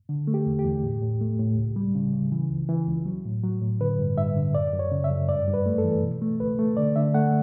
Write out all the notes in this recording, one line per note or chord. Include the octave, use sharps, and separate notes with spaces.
D3
A3
G4
E2
G4
E2
A2
A2
A3
A2
C#2
G3
C#3
C#3
E3
C#2
E3
C#2
F#3
A2
F#3
A2
D3 B4
G2
G2 E5
D3
F#2 D5
F#2
C#5
C#3
E5
F#2
G2 D5
G2
B4
A3
A4
E3
B2
A3
C#2 B4
A3
D3 D5
D3 E5
A3 F#5